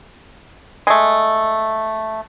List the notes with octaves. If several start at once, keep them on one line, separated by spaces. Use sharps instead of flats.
G#3 A3